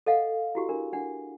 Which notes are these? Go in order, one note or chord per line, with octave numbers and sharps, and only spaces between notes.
A4 D#5 F5 F#5
E4 F#4 G4
D4 A#4
D4 F#5